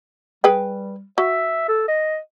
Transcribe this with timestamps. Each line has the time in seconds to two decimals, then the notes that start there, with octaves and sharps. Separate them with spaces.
0.44 G3 G#4 B4 G5
1.18 F#4 E5
1.68 A4
1.88 D#5